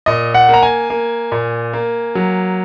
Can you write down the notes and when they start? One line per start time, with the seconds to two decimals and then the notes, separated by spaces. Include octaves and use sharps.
0.06 A#2 D#5
0.34 F#5
0.49 A#3
0.54 A#5
0.63 G#5
0.90 A#3
1.32 A#2
1.73 A#3
2.15 F#3